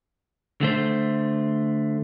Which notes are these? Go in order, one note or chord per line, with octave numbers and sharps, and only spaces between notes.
D3 A3 C5